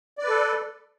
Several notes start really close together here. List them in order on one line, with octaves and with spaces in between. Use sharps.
D5 B4 A4